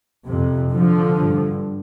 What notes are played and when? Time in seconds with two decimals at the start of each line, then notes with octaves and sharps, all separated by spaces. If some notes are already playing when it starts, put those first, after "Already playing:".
0.27 F2 C3
0.72 D3 F3
1.17 G2